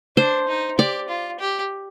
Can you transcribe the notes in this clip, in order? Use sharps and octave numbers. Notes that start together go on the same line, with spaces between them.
D4 C5
D#4
G4 D5
F4
G4